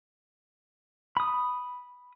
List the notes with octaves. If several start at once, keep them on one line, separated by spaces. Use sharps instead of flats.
B5 D#6